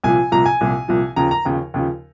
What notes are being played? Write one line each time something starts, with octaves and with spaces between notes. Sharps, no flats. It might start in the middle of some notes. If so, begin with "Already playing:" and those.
C2 A#2 F3 G#5
C2 A#2 F3 A#5
G#5
C2 A#2 F3
C2 A#2 F3
D#2 C#3 F3 A#5
A#5
D#2 C#3 F3
D#2 C#3 F3